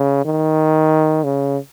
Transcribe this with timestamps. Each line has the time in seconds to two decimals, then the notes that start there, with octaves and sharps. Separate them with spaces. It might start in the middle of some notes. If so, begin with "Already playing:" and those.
Already playing: C#3
0.25 D#3
1.24 C#3